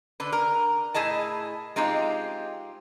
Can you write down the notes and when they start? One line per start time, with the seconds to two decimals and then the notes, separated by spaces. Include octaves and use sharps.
0.20 D3 B4
0.32 A#4
0.94 A2 E4 G#4 D#5 A5
1.76 G#3 C4 D#4 F4 G4